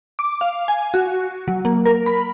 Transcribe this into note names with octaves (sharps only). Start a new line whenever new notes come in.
D6
F5
G#5
F#4
F#3
A#3
A#4
B5